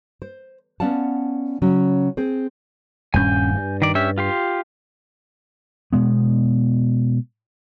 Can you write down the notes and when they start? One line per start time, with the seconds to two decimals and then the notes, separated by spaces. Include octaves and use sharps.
0.22 C5
0.80 B3 C#4 D5 F5 F#5 A5
1.62 C#3 F#3 C#4
2.17 C4 G#4 C5
3.14 D#1 G2 C#4 G#5 G6
3.55 G2
3.82 D#3 D5
3.95 C#4 G4 E5
4.18 F4 G4 C6
5.93 B2 G#3 B3